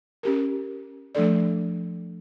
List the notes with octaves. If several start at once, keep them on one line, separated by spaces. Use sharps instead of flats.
C#4 G4 A#4
F3 A3 D4 A4 D5